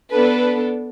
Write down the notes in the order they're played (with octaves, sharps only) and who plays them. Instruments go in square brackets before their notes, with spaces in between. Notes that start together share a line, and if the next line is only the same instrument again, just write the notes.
[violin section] B3 D4 A4 B4